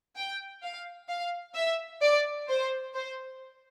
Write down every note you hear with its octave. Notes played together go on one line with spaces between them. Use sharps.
G5
F5
F5
E5
D5
C5
C5